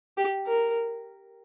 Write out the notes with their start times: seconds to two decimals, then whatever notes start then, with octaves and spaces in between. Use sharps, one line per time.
0.17 G4
0.47 A#4